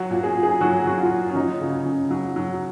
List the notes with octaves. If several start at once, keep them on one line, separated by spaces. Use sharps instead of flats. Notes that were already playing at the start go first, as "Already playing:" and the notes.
Already playing: F#3 F#4
A#2
G#4
A#2
G#4
F#3 F#4
F#3 F#4
F4
A#2
C#4
F#3 D#4
C#3
C#3
F#3
F#3